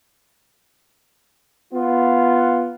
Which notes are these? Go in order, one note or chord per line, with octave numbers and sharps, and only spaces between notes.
B3 F4